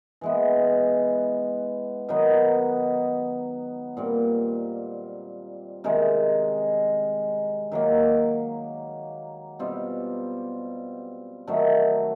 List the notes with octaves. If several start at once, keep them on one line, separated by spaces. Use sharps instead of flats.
E3 G#3 B3
D#3 F#3 B3 D#4
A#2 G3 C4
C3 D#3 G#3
D#3 F#3 A#3
B2 G3 C4 F4
D#3 F#3 A3